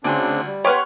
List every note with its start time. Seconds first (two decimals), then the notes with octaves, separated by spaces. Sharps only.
0.04 D2 C#3 C4 D4 D5 G#5 C6
0.46 G3
0.64 G4 B4 C#5 F#5 C6 F6